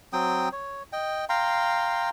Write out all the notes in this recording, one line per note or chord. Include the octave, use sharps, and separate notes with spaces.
F#3 C4 G5 D#6
C#5
D#5 G5
F5 G5 A#5 C6